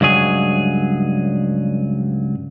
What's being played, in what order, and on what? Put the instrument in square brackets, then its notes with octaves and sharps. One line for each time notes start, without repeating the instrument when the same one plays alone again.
[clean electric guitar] C#2 G2 F#3 G#4